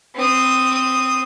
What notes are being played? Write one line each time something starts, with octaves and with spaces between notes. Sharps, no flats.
C4 D#6